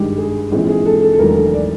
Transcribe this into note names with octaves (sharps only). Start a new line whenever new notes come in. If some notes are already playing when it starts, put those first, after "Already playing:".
Already playing: G#1 G2 D#3 G#3 G4
G#4
A#1 G#2 E3 G#3 C4
G#4
A4
A4
A4
E1 D#2 D3 F#3 A3 A#4
A4
D5